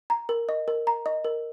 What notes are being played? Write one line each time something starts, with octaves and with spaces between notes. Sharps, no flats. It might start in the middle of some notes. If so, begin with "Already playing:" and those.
A#5
A#4
D#5
A#4
A#5
D#5
A#4